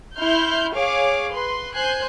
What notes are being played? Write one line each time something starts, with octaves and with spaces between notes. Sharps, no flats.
E4 C6 F6 G6
G#4 C#5 F5 D6
B4 C6
C5 G#5 F#6 G6 C7